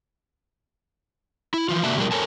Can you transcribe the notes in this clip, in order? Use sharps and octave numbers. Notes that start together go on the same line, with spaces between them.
E4
E3 F3 F4
C3 A#3 F#4 D5 E5 A5
B2 F3 G3 G#3 D4 A#4
A4 A#4 C#5 G#5 A5